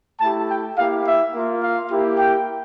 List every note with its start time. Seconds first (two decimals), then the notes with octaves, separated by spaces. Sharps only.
0.20 A3 E4 G4 A5
0.48 G5
0.76 A#3 E4 G4 F5
1.05 E5
1.33 A#3 F4
1.62 F5
1.90 A#3 E4 G4
2.18 G5